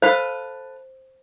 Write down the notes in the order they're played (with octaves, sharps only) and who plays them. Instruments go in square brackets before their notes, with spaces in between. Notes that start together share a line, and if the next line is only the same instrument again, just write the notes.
[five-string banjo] A4 B4 F5 [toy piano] C5